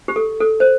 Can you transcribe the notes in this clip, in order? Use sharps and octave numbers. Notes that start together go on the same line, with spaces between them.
G4
A4
A4
C5